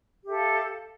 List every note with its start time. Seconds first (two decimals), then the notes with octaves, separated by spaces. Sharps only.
0.24 G4
0.27 E5
0.30 A4
0.33 F5